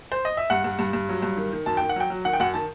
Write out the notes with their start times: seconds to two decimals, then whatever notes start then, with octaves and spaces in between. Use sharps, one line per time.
0.12 C5
0.25 D#5
0.37 E5
0.50 G2 F#5
0.64 G2
0.79 G2
0.93 G2
1.09 F#3
1.22 G2
1.37 D#3
1.53 D#3
1.66 F#2 A5
1.77 D#3 G5
1.89 F#5
1.96 F#3 G5
2.10 F#3
2.25 D#3 F#5
2.33 G5
2.40 F#2 F#5
2.54 D#3 A5